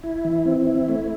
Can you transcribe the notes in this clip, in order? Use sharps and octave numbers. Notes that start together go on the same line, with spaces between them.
E4
E3
C4
E4
A3